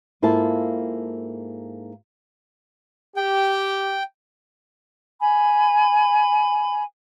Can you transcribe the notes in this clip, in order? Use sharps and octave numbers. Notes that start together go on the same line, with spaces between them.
G#2 A#3 E4 F4 A4 A5
G4 G5
G#5 B5